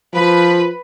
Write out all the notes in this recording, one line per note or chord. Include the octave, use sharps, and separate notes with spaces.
F3 B4